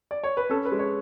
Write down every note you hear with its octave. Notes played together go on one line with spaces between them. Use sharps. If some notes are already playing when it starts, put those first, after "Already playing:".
D5
C#5
B4
C#4 A4
B4
G#3
C#5